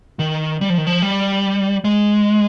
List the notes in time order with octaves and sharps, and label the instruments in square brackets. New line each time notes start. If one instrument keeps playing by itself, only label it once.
[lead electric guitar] D#3
G3
F3
D#3
F3
G3
G#3